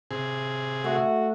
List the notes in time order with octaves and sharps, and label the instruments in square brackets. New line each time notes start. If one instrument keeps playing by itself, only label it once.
[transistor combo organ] C3 G#4
[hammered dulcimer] A3 [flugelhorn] F#4